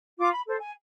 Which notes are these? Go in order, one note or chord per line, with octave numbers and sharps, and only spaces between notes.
F4 D6
B5
A4 C5
G#5